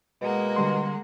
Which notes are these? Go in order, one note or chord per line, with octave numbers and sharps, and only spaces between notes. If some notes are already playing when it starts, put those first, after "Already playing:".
B2 G#3 A#3 F#5
D3 G3 C6